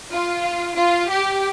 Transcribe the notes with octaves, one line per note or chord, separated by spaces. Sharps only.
F4
F4
G4